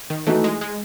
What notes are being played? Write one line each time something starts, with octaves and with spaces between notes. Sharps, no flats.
D#3
E3 A3 D#4 F#4
G#3
G#3